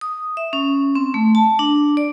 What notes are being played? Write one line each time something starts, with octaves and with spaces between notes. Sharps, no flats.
D#6
E5
C#4
C4
A3
A5
D4
D5